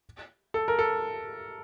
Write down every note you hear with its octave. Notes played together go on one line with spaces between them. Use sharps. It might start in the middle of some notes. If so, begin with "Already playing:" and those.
A4
A#4
A4